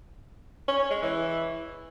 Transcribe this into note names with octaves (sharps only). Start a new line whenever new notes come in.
C#4
C#4
G#3
E3